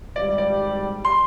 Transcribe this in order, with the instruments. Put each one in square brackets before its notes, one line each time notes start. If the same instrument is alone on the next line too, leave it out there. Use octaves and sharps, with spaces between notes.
[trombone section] G#1 G#2 G3 [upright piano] D5
[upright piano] D5
C6